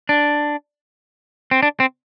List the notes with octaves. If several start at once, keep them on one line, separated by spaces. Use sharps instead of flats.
D4
C4
D4
C4